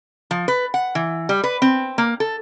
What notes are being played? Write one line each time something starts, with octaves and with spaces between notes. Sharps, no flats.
F3
B4
F#5
E3
G3
B4
C4
A#3
A4